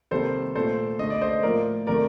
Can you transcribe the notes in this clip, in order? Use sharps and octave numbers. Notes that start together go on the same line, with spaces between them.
C3 D#3 G3 A#3 A4 C5
A#2 A3 A4 C5
D3 A3 D#5
D5
C5 D#5
A2 F3 A#3 A#4 D5
C3 D#3 A3 A#4 D5